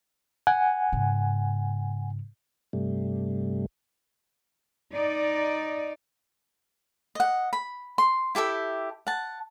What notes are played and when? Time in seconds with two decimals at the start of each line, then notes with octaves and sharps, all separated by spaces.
0.47 F#5 G#5
0.92 G#2 C#3
2.73 G2 C3 G3 A3
4.93 D#4 D5
7.15 D#5 F#5
7.53 B5
7.98 C6
8.35 E4 G4 A4 E5
9.07 F#5 A5